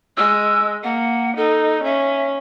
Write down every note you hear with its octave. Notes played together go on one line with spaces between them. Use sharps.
G#3 E6
A#3 F#5
D#4 A4
C#4 E5